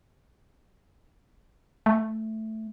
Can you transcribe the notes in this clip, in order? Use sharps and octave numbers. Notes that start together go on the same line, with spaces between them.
A3